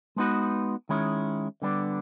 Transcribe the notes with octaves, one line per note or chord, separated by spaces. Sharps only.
G#3 B3 D#4 F#4 B4
D#3 G#3 C#4 E4
D3 G3 B3 D4